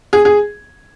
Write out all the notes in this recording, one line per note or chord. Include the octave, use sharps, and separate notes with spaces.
G#4
G#4